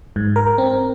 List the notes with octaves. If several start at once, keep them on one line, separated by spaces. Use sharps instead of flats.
G#2
A#4
C4